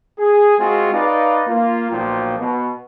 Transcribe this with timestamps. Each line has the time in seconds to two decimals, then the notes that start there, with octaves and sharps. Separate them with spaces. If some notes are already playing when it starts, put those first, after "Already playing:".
0.18 G#4
0.58 G#3 C4 F4 F#4 G#4
0.93 D#4 B4 D5 F5
1.47 A#3 F4
1.91 B1 A#2 F3 C5 G5
2.38 B2